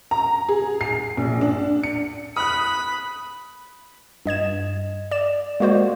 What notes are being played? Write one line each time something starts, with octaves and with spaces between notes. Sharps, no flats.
A#5
G#4
C7
A#1
D4
C#7
B5 D#6 F#6
G2 D#5 G#6 E7
D5 E7
G#3 A#3 F#4 C5 D5